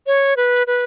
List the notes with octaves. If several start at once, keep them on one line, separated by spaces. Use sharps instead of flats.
C#5
B4
B4